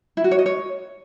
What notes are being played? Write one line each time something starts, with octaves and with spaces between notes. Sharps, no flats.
E4
F#4
C#5
D#5
C#5